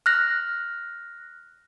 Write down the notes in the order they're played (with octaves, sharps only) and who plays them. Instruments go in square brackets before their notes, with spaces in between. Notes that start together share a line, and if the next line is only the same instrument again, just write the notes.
[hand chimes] F6 F#6 A#6